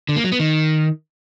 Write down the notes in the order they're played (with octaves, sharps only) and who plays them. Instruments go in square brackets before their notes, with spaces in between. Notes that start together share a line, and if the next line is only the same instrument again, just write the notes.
[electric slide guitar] D3
A#3
F#3
B3
D#3